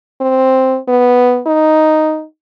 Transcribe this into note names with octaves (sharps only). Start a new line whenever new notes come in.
C4
B3
D#4